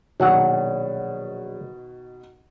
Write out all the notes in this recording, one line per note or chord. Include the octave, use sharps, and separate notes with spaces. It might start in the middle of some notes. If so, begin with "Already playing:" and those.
A#1 B2 D#3 F#3 F#5